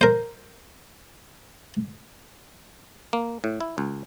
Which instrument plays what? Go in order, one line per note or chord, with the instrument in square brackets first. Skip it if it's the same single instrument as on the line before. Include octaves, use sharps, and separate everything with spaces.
[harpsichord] A#4 C5
[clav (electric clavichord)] A#3
A2
E4
C#2